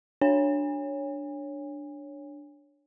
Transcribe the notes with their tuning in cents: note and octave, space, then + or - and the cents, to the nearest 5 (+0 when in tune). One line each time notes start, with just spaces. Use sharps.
D4 +0 C#5 +0 G#5 -35